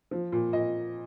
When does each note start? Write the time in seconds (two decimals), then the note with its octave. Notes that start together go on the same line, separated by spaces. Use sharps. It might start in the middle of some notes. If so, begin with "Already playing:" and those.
0.11 F3
0.32 A#2
0.53 A#2 D#5